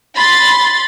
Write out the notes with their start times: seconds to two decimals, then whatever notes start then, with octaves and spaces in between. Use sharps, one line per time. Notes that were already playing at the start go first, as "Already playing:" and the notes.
0.16 B5 C6 A6